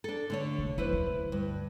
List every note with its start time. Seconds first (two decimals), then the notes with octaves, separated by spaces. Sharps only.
0.04 D4 A4
0.30 D3 A3 C#5
0.59 C2
0.78 E2 F#3 E4 B4 C5
0.93 D2
1.32 G2